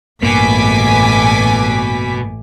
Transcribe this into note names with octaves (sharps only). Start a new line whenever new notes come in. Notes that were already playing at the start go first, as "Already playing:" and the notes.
A1 G2 B2 A#3 G#5 D6 B6